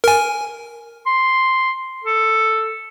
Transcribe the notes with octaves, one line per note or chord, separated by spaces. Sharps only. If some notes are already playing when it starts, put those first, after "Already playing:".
A#4 G#5
C6
A4